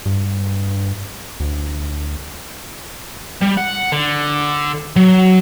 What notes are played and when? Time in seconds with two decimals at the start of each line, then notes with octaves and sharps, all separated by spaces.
0.06 G2
1.40 D2
3.42 G3
3.57 F#5
3.92 D3
4.96 F#3